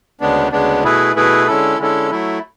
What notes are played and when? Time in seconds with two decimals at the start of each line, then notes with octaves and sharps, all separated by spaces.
0.20 D2 C#3 G#3 B3 D4
0.52 D2 C#3 G#3 B3 D4
0.84 B2 A3 E4 G#4 B4
1.16 B2 A3 E4 G#4 B4
1.47 D3 G#3 C#4 E4 A4
1.79 D3 G#3 C#4 E4 A4
2.11 F#3 A3 E4